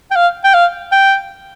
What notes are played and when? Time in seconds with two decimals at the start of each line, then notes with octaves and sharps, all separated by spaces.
0.11 G5
0.16 F5
0.44 G5
0.54 F5
0.92 G5